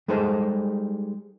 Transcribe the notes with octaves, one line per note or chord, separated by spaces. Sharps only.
G3 G#3 D#4 G#4 A4 C5